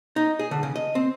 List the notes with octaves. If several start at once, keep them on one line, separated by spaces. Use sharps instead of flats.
D#4
G#4
D3
C#3
D#5
C4